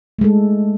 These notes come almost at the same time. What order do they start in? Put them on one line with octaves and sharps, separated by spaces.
A3 G#3 A4